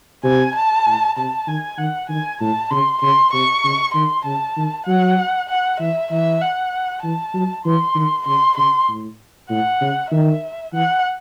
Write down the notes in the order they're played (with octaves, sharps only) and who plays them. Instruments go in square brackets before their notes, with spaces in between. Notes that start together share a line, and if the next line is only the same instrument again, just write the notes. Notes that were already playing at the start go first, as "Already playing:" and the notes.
[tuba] C3 [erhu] G#5
[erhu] A5
[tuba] A2
[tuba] C3 [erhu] A5
[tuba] D#3 [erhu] G#5
[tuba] D#3 [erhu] F#5
[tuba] D#3 [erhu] G#5
[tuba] A2 [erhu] A5
[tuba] C#3 [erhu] C6
[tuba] C#3 [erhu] C6
[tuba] C3 [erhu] C#6
[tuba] C#3
[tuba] D#3 [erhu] C6
[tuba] C#3 [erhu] A5
[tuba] D#3
[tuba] F#3 [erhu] F#5
[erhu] F#5
[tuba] E3 [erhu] E5
[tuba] E3 [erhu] E5
[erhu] F#5
[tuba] E3 [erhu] A5
[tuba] F#3
[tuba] E3 [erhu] C6
[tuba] D#3
[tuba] C#3 [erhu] C6
[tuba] C#3 [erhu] C6
[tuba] A2
[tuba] A2 [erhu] F#5
[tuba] C#3
[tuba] D#3 [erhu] E5
[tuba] E3 [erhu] F#5